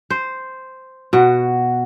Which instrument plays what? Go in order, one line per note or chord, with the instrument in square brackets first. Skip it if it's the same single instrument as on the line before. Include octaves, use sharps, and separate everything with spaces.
[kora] C5
[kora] B2 [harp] F#4